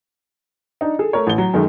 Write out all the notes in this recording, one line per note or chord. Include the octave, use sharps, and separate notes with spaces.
D4 D#4
G#4 A4
A3 A#4 C#5
A1 G7
F#3
F#2 D#3 G#3 A3